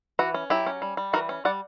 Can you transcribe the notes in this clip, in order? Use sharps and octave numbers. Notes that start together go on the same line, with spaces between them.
E3 F#4
C#4
F#3 E4 G4
C#4
G3
G3
E3 F#4 A#4
C#4
G3 D5 F#5